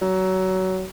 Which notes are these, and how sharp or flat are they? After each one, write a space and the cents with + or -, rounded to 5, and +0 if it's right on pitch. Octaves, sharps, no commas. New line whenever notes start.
F#3 +20